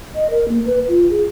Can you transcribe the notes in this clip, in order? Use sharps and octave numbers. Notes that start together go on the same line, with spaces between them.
D#5
A#4
A#3
B4
F4
G#4